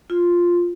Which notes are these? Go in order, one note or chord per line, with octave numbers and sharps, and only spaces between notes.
F4